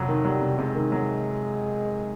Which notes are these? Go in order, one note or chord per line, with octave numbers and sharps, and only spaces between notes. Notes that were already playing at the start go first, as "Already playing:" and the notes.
Already playing: F2 C3 F#3
D#3
F#3 G3
C3
C3 G#3
D#3
F#3